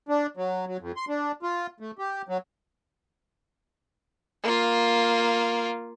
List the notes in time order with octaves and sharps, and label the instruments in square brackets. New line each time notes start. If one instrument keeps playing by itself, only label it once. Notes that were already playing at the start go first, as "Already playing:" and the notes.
[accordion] D4
F#3
F#3
F2
C6
D4
F4
A3
G4
F#3
[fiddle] A#3 F4